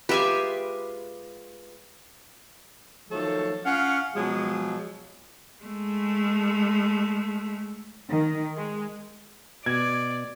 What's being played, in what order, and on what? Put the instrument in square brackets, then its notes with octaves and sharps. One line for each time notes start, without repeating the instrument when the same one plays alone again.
[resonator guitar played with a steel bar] G#3 F4 B4 [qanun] G4 E5 G#5
[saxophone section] D#3 F3 F#3 A3 A4 C#5
C#4 F4 F5 F#5
B2 F3 F#3 G#3
[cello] G#3 A3
[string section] D#3
G#3
[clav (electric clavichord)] B2 [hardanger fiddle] D5 [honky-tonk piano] G#6